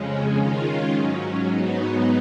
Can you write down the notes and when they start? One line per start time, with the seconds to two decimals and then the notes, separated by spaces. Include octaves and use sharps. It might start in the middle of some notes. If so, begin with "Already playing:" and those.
Already playing: F2 C#3 G#3 C#4
0.36 D#3 G#3 C#4 F4
0.92 G#2 F#3 C#4
1.49 G#2 F#3 B3 D#4